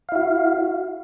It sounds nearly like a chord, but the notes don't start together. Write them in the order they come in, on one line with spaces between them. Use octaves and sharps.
F5 E4 F#4